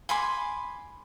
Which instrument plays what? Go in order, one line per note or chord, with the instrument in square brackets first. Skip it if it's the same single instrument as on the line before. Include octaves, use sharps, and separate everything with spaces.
[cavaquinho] G#5 B5 C6 D6